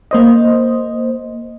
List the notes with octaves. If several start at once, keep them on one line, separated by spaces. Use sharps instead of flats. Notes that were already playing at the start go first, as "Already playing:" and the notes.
A#3 C5 D#5